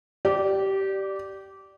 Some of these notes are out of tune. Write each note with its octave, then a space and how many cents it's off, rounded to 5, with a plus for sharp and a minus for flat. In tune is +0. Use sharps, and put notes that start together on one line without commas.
G4 -20 D5 +5